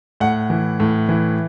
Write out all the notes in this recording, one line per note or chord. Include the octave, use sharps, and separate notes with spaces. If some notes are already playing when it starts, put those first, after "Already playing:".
A2 F#5
E3
A2
E3